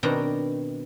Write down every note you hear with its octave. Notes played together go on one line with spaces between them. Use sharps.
B2 D#3 C4 D4 A#5